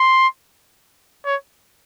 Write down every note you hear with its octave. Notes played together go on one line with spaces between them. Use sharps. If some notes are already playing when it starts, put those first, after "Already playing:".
Already playing: C6
C#5